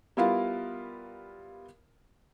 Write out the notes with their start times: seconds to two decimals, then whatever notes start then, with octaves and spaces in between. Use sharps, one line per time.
0.17 G3 B3 E4 F4 A#4 F5